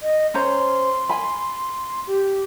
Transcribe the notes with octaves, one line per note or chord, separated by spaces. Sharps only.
D#5
C#4 C5 A#5 C6
G#5 B5
G4